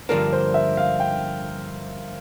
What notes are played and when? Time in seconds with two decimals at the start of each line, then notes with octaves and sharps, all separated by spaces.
0.09 G2 D3 F3 A#3 D4 A#4
0.32 C5
0.54 E5
0.77 F5
1.00 G5